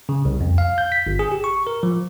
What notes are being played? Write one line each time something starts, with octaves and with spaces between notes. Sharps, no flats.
C#3
C2
F2
F5
G6
B6
G1
G#4
G4
C#6
A#4
F3